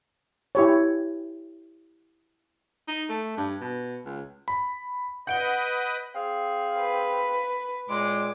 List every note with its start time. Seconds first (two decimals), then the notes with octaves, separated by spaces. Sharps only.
0.55 E4 G4 C#5
2.88 D#4
3.09 A3
3.37 G2
3.61 B2
4.05 C#2
4.48 B5
5.27 B4 D#5 F#5 G6 D7 G7
6.15 C4 G#4 F5
6.79 B4
7.90 C#2 A#2 G#3 D6